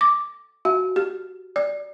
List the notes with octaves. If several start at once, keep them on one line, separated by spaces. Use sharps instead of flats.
D6
F#4
G4
D5